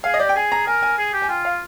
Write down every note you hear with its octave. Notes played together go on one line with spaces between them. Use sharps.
G#4 F5
D#5
G4 D5
G5
G#4 G#5
A#5
A#4 G#5
G#5
G#4
G4
G#5
F4 G5
F5